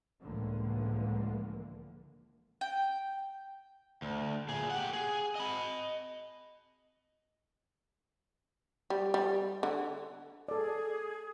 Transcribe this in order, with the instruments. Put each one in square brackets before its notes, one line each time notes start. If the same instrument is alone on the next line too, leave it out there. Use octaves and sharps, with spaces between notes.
[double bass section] C#2 A2 D3 E3 F3 A#3
[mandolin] G5
[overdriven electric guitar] D2
A#2 G#4
G4 F#5
G#4
D#5 B5
[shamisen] G3
G3
D3
[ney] G#4 [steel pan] A4 D5